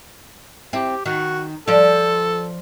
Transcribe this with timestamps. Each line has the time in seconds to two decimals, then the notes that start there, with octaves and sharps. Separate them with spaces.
0.73 C4 E4 G4
1.06 D#3 F#4
1.68 F3 A4 D5